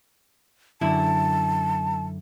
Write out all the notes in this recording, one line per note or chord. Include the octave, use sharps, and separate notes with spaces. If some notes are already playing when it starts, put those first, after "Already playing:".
F#2 D3 E4 A5